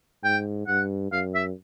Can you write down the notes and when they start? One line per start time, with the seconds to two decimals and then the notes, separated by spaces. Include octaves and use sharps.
0.24 G#2 G5
0.67 G2 F#5
1.12 F#2 F5
1.35 E5